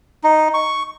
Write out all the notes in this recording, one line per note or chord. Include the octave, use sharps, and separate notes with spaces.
D#4
C#6